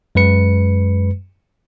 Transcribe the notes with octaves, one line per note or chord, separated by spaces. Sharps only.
F#2 G#3 B4 C#7